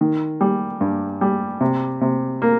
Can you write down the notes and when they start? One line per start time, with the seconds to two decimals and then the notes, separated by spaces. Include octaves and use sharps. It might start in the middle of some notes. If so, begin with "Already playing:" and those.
0.01 D#3
0.41 G3
0.81 G2
1.21 G3
1.61 C3
2.01 C3
2.42 A#3